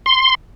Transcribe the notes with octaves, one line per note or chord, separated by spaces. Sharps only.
C6